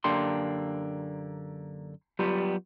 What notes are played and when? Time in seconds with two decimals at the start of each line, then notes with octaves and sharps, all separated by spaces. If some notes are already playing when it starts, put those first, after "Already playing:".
0.04 F#2 D3 A#3 D4 G4 C6
2.19 F#3 G3 B3 F4 G4